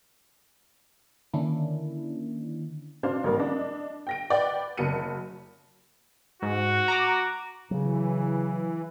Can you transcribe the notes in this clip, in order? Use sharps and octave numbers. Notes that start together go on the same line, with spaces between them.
D3 D#3 A#3 C#4 D4 E4
B2 D4 C5 F5
A1 G2 A#3 A#4
D4 D#5
G5 A#6 D7
B4 D5 F#5 G5
F#1 F#2 C#7 D#7
G#2 F#4
A#5 D6
C#3 E3 F#3